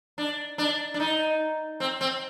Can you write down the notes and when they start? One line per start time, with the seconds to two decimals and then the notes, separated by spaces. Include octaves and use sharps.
0.18 D4
0.58 D4
0.94 D4
1.00 D#4
1.80 C4
2.01 C4